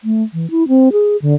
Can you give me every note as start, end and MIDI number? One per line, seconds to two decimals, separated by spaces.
0.04 0.23 57
0.34 0.50 52
0.51 0.67 64
0.68 0.89 60
0.92 1.17 68
1.22 1.34 50